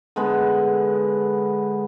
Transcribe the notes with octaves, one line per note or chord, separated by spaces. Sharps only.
D3 G#3 B3